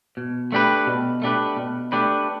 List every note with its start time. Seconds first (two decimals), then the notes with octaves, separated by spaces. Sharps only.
0.17 B2
0.52 A3 D4 G4 B4
0.87 B2
1.22 A3 D4 G4 B4
1.57 B2
1.92 A3 D4 G4 B4